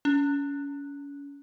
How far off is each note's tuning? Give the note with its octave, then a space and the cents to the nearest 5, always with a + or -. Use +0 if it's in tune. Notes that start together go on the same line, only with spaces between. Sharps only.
C#4 +35